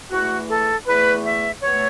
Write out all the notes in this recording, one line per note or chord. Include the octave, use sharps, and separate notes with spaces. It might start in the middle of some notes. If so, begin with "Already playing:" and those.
E2 E3 A3 F#4
A4
E2 E3 A3 B4
E5
B2 A3 C#5